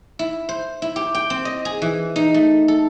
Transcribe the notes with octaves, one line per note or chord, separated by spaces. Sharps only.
E4
C5
E4
G4
G5
C4
D#5
G#4
E3
D#4
A3
A4